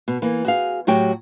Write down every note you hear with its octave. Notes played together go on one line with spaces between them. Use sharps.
B2
E3 A#3
F#4 G#4 F5
A2 F#3 F#4 G4 C#5 G5